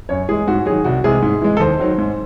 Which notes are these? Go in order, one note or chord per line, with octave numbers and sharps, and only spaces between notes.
F#2 C#5
E3 G#3 G#4
G#2 F#4
D#3 F#3 G#4
C2 F#4
C3 E3 G#3 G#4
G#2
E3 G#3
A4
D#2 C5
D#3 F#3
G#2